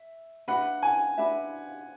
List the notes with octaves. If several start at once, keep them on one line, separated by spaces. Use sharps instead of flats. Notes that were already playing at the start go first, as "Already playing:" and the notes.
Already playing: E5
D4 F#4 B4 E5 F#5
G#5
D4 F#4 B4 E5